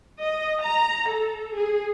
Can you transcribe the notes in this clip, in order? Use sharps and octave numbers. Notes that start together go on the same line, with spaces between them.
D#5
A#5
A4
G#4